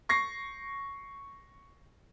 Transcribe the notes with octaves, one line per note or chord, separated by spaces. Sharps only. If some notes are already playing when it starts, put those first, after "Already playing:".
C#6 A#6 C7